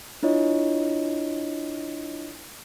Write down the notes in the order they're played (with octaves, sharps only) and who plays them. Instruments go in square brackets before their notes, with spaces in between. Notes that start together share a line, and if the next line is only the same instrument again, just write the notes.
[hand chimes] D4 E4 F4 C#5 D#5